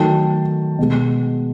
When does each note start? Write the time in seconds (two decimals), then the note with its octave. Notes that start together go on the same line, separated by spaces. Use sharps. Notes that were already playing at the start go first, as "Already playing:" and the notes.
Already playing: D#3 F#3 A3 G5 A5
0.79 B2 G#3